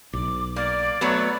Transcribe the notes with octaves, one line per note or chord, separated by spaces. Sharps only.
B1 D6
A#3 D5
F#3 A3 B3